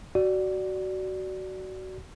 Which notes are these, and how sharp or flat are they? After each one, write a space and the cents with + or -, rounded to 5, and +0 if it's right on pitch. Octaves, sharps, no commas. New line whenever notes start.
F#4 +20 D5 +0